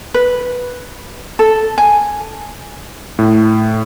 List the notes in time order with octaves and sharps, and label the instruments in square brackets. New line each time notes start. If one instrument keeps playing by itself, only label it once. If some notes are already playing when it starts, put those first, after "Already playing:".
[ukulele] B4
A4
G#5
[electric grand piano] A2